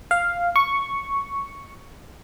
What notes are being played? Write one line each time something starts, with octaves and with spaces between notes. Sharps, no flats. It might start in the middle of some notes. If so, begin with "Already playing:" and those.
F5
C#6